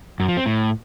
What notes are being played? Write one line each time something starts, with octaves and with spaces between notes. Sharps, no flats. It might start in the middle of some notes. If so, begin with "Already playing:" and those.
F#2
F3
C4
A2